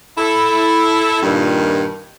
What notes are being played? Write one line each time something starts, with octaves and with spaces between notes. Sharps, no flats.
E4 A4
G2 A#2 D#3